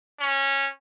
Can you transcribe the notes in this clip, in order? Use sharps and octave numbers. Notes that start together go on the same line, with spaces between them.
C#4